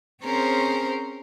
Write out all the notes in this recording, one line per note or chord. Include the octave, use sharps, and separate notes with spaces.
C4 C#4 G#4 A#4 C5